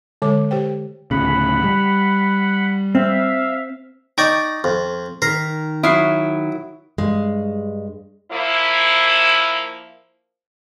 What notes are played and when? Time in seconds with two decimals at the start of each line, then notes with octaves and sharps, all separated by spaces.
0.22 D3 G#3 C#5 D6
0.51 G4 C5 G5
1.11 D2 A2 C#3 F#5 B5
1.64 G3
2.95 C4 E5 F5
4.18 D#4 D5 G5 C#6 G6
4.64 F2
5.22 D#3 A#4 B6 C7
5.83 F#3 E4 D#6 F6 C7
6.98 G2 G#3
8.32 F3 A#3 E4